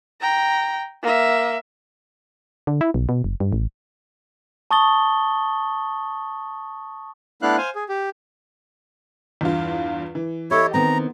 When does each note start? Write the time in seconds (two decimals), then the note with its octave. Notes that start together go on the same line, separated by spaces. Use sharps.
0.21 G5 A#5
1.03 A#3 E5
2.67 D3
2.81 E4
2.94 B1
3.09 B2
3.24 F#1
3.40 G2
3.53 A1
4.71 A5 C#6 D#6 A6 G7
7.42 A3 B3 D4 E4 F5 F#6
7.58 C5 F5 G#5
7.75 G#4
7.89 G4
9.41 E2 G2 F4
10.15 E3
10.51 E4 G4 A4 C#5 D#5
10.74 D#3 B3 C4 A#5